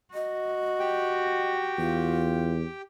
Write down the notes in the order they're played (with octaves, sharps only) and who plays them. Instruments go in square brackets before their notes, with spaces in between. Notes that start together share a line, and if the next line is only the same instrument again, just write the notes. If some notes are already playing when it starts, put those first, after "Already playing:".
[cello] F#4 [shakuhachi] D#5
[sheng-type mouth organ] G4 G5
[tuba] E2 [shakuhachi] F4